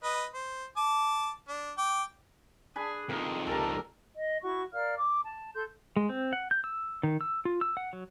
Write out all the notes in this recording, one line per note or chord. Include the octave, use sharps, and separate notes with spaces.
B4 D#5
C5
A5 D6
D4
G5 D6
D4 G#4 G#5 B5
F2 D#3 G#4 A#4
C#2 G4 A4 A#4 A5 A#5
D#5
E4 F#4 C#6
A#4 D5 F5 F6
D6
A5
A4 C6 G6
G#3
C4
F#5
G6
E6
D#3
E6
F4
E6
F#5
F#3